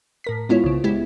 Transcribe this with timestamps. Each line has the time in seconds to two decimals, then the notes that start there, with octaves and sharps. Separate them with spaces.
0.24 A2 A#4 B6
0.49 G#3 B3 E4 F4 C#5
0.64 C2 C#3
0.84 G#3 B3 E4 G4